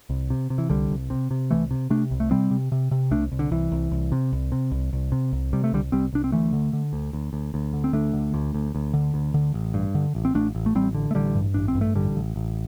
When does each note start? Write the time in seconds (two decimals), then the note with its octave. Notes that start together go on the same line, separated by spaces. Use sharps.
0.10 C2
0.30 C3
0.50 C3
0.58 E3
0.69 C2 D3 G3
0.91 C2
1.10 C3
1.31 C3
1.51 C2 E3 A3
1.71 C3
1.90 C3 A3 D4
2.11 C2
2.20 A3
2.31 C3 G3 C4
2.51 C3
2.72 C3
2.91 C3
3.11 C2 A3 D4
3.32 C2
3.39 D3
3.51 C2 E3
3.71 C2
3.91 C2
4.12 C3
4.32 C2
4.52 C3
4.71 C2
4.93 C2
5.12 C3
5.33 C2
5.53 C3 G3
5.64 A3
5.72 C2 D3 G3
5.92 C2 G3 C4
6.13 C2 D4
6.24 C4
6.32 D2 E3 A3
6.53 D3
6.73 D3
6.93 D2
7.13 D2
7.33 D2
7.54 D2
7.73 D3
7.84 C4
7.93 D2 A3 D4
8.13 D3
8.34 D2
8.54 D2
8.75 D2
8.94 D3
9.14 D2
9.34 D3
9.54 A1
9.74 G2
9.95 D3
10.15 A1
10.25 C4
10.34 A1 A3 D4
10.55 A1
10.66 A3
10.75 A1 G3 C4
10.94 D3
11.11 A3
11.15 A1 D3 G3
11.35 G2
11.54 A1 D4
11.68 C4
11.75 G2
11.81 A3
11.95 A1 D3 G3
12.15 A1
12.36 A1